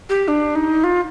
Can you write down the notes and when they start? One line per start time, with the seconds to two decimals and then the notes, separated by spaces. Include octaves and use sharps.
0.09 G4
0.28 D4
0.55 D#4
0.84 F4